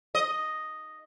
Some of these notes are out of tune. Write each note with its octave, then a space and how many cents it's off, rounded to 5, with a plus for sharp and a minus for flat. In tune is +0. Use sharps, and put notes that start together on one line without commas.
D#5 +0